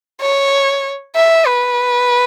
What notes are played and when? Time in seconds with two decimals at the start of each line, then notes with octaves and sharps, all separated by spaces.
0.21 C#5
1.16 E5
1.46 B4